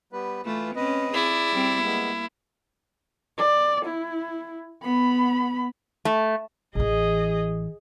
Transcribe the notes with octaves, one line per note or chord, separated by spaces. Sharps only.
G3 B3 B4
E3 A3 F4 B4
C4 C#4 B4 D#5
E4 G#4 D5
G3 C4
G#3 A#3 B3
D5
E4
B3 B5
A3
A1 E3 G#4 D#5